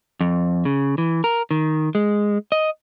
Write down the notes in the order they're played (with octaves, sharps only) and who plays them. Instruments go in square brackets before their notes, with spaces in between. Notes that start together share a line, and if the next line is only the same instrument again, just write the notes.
[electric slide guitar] F2
C#3
E3
A#4
D#3
G#3
D#5